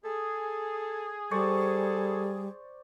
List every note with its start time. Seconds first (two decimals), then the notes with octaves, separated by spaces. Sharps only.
0.05 G#4 A4
1.31 G3 A4 C5 D5 C#6